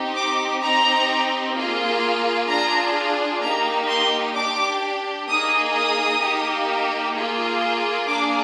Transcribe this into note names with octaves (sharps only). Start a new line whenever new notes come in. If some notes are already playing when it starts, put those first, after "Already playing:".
Already playing: C4 D#4 G4
D6
C4 D#4 G4 A#5
A#3 F4 G#4
D4 F4 G#4 A#5
A#3 D#4 G4 A#5
C6
D4 G4 D6
A#3 D#4 G#4 D#6
D#6
A#3 D#4 G4
A#3 F4 G#4
A#3 D4 G#4 D6